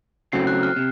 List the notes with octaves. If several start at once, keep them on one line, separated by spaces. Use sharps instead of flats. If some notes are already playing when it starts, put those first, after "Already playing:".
C#3 F#3 A3 C4 C7
F#6
F6
C3